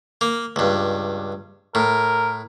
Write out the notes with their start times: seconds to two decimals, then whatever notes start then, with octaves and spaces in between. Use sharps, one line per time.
0.21 A#3
0.56 C#2 G2
1.75 A2 A#4